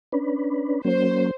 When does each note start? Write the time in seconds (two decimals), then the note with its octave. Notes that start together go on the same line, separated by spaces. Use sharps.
0.12 C#4 D4 B4
0.85 F#3 A#3 C#4 C5